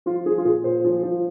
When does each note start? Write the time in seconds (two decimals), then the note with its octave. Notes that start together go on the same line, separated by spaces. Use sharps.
0.06 F3 F4
0.26 F3 G#4
0.38 F4
0.45 A#2 G#4
0.64 A#2 C5
0.84 F3
1.03 F3